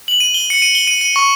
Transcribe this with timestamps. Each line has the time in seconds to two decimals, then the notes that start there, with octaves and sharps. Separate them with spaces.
0.08 F#7
0.20 D#7
0.34 G7
0.50 C#7
0.62 D#7
0.75 G7
0.87 D#7
1.01 D#7
1.16 C#6